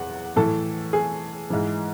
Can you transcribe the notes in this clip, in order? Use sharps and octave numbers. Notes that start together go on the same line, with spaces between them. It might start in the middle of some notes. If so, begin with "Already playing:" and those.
Already playing: E2 F#5
A2 E3 A4
G#4
G#2 E3